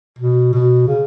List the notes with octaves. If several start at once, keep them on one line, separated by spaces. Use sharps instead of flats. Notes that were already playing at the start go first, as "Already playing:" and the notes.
B2
B2
C#3